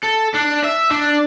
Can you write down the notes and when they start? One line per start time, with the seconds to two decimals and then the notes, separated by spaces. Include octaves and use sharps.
0.04 A4
0.35 D4
0.64 E5
0.91 D4